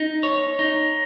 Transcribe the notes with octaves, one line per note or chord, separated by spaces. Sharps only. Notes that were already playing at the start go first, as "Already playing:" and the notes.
Already playing: D#4
C#5
D#4